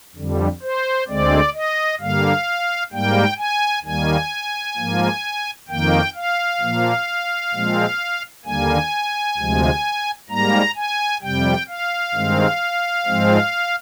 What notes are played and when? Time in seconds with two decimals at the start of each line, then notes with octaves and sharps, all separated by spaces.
0.16 F2 D3 G3
0.62 C5
1.08 D2 D3 G#3 C4 D5
1.53 D#5
2.00 G2 D3 G3 A#3 F5
2.92 G#2 G3 A#3 G5
3.38 G#5
3.85 D#2 D#3 G3 A#3 G#5
4.77 G#2 F3 A#3
5.68 F2 D#3 A#3 G5
6.15 F5
6.61 A#2 F3 A#3
7.53 A#2 F3 G#3 C4
8.45 D#2 D3 G3 A#3 G#5
9.37 D2 C3 F3 G#3
10.30 G#2 G3 A#3 A#5
10.76 G#5
11.22 F2 C3 G3 G5
11.68 F5
12.14 G2 D#3 G#3 C4
13.06 G#2 F3 G#3 C4